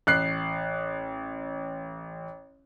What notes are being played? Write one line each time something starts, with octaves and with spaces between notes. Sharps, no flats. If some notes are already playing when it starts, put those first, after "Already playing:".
A1 F#6 C7